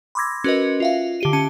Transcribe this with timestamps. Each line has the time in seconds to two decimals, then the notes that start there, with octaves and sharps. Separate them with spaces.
0.15 B5 C6 D6 E6 G#6 A#6
0.44 C#4 F#4 A#4 B4 D#5
0.80 F4 E5 F5
1.20 D3 G4 D#7
1.33 C#4 A5 C#7 D#7